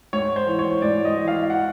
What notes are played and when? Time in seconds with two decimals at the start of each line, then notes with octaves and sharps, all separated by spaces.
0.13 G#2 C#5
0.36 C5
0.47 E3
0.59 C#5
0.82 G#2 D5
1.05 D#5
1.16 E3
1.27 F5
1.50 F#5